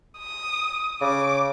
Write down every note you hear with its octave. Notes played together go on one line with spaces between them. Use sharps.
D#6
C#3 D6